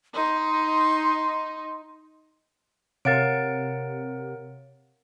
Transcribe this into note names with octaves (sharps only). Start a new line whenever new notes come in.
D#4 C6
C3 A#4 C#5 F5 F#5 A6 D7